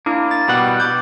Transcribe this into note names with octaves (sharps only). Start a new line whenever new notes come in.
A#3 D4 E4
A6
B2 G3 F#5
D6 G6